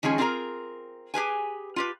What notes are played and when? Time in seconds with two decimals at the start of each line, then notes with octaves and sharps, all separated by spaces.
0.03 D#3 F3 G#3 C#4 G#4
0.18 C4 D4 F4 G#4 A#4 A#5
1.14 G4 G#4 B4 G#5
1.76 F4 G4 B4